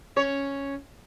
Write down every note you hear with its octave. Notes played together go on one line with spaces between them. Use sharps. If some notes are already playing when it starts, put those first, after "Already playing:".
C#4 C#5